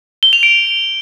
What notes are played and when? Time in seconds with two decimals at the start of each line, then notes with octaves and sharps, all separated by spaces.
0.23 G7
0.33 F7
0.43 D7